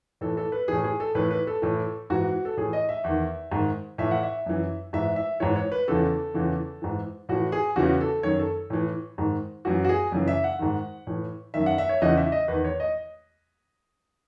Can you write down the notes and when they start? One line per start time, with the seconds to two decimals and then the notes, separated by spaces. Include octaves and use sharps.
0.21 A2 E3 A4
0.37 A4
0.52 B4
0.68 A2 E3 G#4
0.84 G#4
1.00 A4
1.15 A2 E3 B4
1.31 B4
1.47 A4
1.62 A2 E3
2.10 G#2 E3 F#4
2.45 A4
2.57 A2 E3 G#4
2.73 D#5
2.89 E5
3.04 E2 D#3
3.52 G#2 D#3
3.98 A2 E3 E5
4.11 F#5
4.23 E5
4.46 F#2 E3
4.93 G#2 E3 E5
5.16 E5
5.40 G#2 E3 C#5
5.56 C#5
5.72 B4
5.88 E2 C#3 E3 A4
6.34 E2 C#3 E3
6.82 G#2 E3
7.29 A2 E3 F#4
7.52 G#4
7.76 E2 C#3 E3 F#4
8.01 A4
8.23 F#2 D#3 C#5
8.39 A4
8.70 A2 E3
9.18 G#2 D#3
9.65 F#2 E3 F#4
9.85 F#4
9.89 G#4
10.12 F#2 C#3 E3
10.28 E5
10.44 F#5
10.59 G#2 D#3
11.07 A2 E3
11.54 F#2 D#3 E5
11.66 F#5
11.78 E5
11.89 C#5
12.02 E2 C#3 E3 D#5
12.17 E5
12.32 D#5
12.48 E2 D#3 B4
12.64 C#5
12.80 D#5